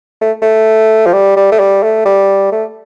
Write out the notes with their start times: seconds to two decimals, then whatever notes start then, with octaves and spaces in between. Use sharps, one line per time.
0.21 A3
0.42 A3
1.06 F3
1.13 G3
1.36 G3
1.52 A3
1.60 G3
1.83 A3
2.05 G3
2.52 A3